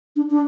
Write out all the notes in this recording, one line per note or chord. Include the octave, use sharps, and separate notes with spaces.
D4
D4